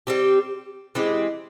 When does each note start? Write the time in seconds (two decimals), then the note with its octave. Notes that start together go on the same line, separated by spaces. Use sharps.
0.07 G3 C4 G4
0.95 E3 G#3 C4 G4